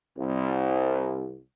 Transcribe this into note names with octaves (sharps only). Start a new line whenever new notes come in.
C2